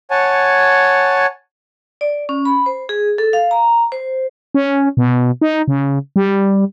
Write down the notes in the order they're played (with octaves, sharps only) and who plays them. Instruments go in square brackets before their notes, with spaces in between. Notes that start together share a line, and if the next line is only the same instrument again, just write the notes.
[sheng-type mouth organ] C#5 F#5 G#5 A5
[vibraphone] D5
C#4
B5
C5
G#4
A4
F5
A#5
C5
[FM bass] C#4
B2
D#4
C#3
G3